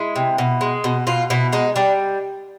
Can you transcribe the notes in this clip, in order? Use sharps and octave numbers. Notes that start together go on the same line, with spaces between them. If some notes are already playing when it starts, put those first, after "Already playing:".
Already playing: G#3 E4
C3
B2
G#3
B2
B2 F4
B2 E4
G#3 D#4
G3 D4